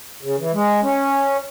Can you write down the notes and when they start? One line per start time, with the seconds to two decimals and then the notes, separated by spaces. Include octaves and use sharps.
0.22 C#3
0.38 E3
0.53 G#3
0.83 C#4